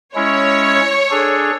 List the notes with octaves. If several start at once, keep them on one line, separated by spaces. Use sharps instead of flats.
G#3 C#4 E4 C#5
D4 G#4 A4